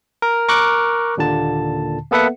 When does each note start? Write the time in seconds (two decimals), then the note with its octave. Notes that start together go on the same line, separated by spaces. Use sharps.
0.22 A#4
0.49 A#4 C#6 D6 F#6
1.17 D#2 A#2 D3 A5
2.11 A#3 B3 A4 B4 E5 F#5